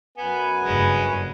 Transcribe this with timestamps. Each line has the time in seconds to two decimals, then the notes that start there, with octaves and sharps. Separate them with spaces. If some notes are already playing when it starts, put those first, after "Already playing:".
0.17 F#2 B3 B4 G#5
0.63 F#1 G2 G#3 C#4